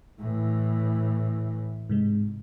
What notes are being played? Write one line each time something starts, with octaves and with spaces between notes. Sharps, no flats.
A2 E3
G#2 C3 G#3